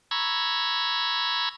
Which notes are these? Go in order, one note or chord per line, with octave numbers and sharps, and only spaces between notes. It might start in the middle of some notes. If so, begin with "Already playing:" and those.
A#5 B5 C#6 E6 G#6